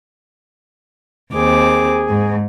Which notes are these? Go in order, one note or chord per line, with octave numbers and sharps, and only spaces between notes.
D#2 C4 G#4 D6
G#2